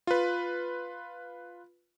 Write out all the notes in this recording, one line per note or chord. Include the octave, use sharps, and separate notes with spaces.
F4 B4